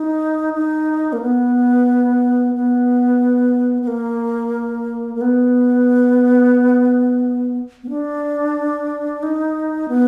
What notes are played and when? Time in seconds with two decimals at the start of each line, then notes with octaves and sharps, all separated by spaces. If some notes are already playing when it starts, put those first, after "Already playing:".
Already playing: D#4
0.54 D#4
1.13 A#3
1.21 B3
2.55 B3
3.82 B3
3.87 A#3
5.15 A#3
5.21 B3
7.83 B3
7.89 D4
9.23 D#4
9.89 B3